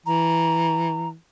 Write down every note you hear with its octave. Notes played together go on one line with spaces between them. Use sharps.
E3 A#5